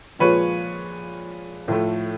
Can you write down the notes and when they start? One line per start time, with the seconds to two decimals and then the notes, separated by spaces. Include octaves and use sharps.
0.19 A#2 F3 G#3 B4 C#5
1.68 A2 F3 A3